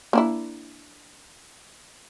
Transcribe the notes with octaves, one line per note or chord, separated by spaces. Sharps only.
A#3 D4 E4